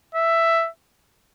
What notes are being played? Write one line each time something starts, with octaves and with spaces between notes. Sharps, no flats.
E5